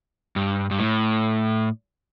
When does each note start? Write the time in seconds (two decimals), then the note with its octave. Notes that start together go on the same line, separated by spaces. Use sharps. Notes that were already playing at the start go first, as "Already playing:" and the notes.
0.36 G2
0.71 G2
0.79 A2